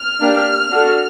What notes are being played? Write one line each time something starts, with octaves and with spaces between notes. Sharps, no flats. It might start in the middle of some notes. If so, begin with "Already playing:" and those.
Already playing: F6
A#3 D4 G4
D4 F#4 A4